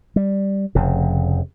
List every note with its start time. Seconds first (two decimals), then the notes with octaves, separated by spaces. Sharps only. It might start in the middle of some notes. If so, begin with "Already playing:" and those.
0.16 G3
0.75 F1 F2 C#3